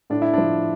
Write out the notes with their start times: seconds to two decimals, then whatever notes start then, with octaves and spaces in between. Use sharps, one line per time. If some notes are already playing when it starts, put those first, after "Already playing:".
0.10 A2 D4
0.22 E4
0.34 F3 D4